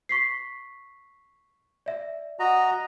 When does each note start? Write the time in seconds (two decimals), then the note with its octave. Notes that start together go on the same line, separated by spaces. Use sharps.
0.09 C#6 B6 C7
1.86 D5 E5
2.39 F#4 D#5 A#5